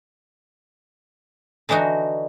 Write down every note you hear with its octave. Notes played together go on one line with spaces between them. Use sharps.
D3 E3 D4 D#4 F#4